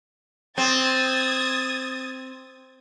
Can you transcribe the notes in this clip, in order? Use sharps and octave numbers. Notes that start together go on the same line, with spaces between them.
C4 D#6 G#6 A6